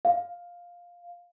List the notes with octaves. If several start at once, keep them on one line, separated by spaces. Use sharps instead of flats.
F5